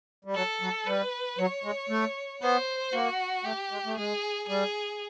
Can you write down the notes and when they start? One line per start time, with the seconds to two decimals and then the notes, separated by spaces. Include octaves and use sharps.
0.25 G3
0.35 F#3 A4
0.61 F#3
0.86 G3 B4
1.38 F#3 C#5
1.64 G#3
1.89 A3
2.42 B3 C5
2.93 A#3 F#4
3.44 A3 G4
3.71 G#3
3.85 A3
3.97 G#3 G#4
4.48 G3 G#4